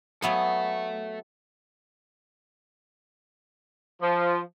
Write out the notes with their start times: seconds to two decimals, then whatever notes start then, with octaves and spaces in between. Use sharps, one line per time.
0.22 F#3 B3 G#4 A4 E5
4.02 F3